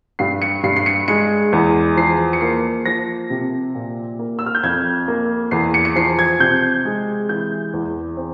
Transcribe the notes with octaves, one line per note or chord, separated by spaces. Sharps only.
G2 C7
C#7
G2 C7
C7
C#7
G#3 C#7
E2
F3 C7
C#7
A#3 C7
F3 A#6
C3
A#2
A#3
E6
F6
G6
F2 G#6
A#3
E2 C7
C#7
C#7
F3 C7
G#6
C3 G6
G#3
E3 G6
E2
C4